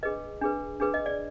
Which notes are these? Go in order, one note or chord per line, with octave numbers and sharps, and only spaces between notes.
D4 G#4 B4 D#5
D4 G#4 B4
D4 G#4 B4
D#5
D5